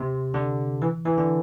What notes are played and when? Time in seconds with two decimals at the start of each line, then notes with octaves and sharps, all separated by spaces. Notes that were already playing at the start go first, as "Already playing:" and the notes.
Already playing: C3
0.34 D3
0.82 E3
1.06 E3
1.18 D3